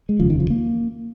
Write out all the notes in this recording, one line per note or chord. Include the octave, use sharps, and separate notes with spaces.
G#3
F1 D#2 C#3 F3
D#3
F3
A#3